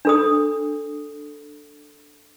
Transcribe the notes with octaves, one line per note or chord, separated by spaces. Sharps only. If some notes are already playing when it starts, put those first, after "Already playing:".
D4 A4 D#6